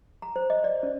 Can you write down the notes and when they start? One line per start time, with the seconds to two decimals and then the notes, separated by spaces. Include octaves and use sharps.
0.22 A#5
0.36 C5
0.50 D#5
0.64 D5
0.83 C#4